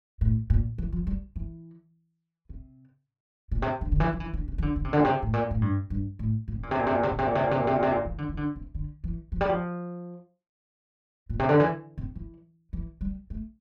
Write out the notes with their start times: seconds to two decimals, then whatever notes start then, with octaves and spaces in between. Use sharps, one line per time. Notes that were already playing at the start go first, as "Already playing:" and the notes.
0.21 A2
0.50 A#2
0.78 E3
0.92 F3
1.07 G3
1.36 E3
2.49 C3
3.51 A#2
3.62 C3
3.81 D3
3.92 D3
4.00 E3
4.13 F3
4.20 E3
4.33 D3
4.48 C3
4.58 E3
4.62 D3
4.76 D3
4.85 C3
4.93 D3
4.99 A#2
5.04 C3
5.22 A2
5.33 A#2
5.51 A2
5.62 G2
5.90 G2
6.19 A2
6.48 A#2
6.55 C3
6.63 A#2
6.71 C3
6.79 A#2
6.87 C3
6.95 A#2
7.03 C3
7.11 A#2
7.18 C3
7.27 A#2
7.35 C3
7.43 A#2
7.51 C3
7.60 A#2
7.67 C3
7.75 A#2
7.82 C3
7.91 A#2
8.05 E3
8.18 D3
8.29 E3
8.37 D3
8.56 C3
8.74 D3
9.04 E3
9.32 F3
9.41 G3
9.49 F3
11.29 A#2
11.39 C3
11.49 D3
11.60 E3
11.98 C3
12.15 E3
12.73 E3
13.01 G3
13.30 A3